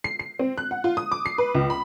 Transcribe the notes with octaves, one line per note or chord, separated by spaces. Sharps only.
C7
C7
C4
F#6
F#5
F4
D#6
D6
C7
B4
C#2
B5